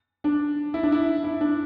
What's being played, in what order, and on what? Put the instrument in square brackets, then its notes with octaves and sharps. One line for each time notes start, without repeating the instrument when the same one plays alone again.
[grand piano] D4
E4
D4
E4
E4
D4